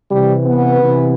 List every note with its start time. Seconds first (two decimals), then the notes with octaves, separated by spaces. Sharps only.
0.10 C3 E3 G3
0.46 B3
0.81 C3 E3